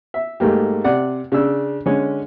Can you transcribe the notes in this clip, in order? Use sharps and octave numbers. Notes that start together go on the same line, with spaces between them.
E5
G#2 A3 A#3 G4
C3 D5 F#5
C#3 D4 E6
D3 G#3 C#4